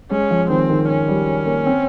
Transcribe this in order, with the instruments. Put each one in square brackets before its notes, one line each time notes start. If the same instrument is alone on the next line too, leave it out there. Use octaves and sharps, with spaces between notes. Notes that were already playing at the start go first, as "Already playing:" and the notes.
[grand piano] G#3 [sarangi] C#4
[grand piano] F3
[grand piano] D#3 [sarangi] C4
[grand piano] D#3
[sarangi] C#4
[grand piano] G3
A#3
C4